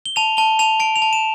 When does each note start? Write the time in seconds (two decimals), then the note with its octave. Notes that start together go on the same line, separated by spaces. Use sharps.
0.06 G7
0.16 A5 F7
0.37 A5 G7
0.59 A5 F7
0.80 A5 D7
0.96 F7
1.02 A5
1.13 E7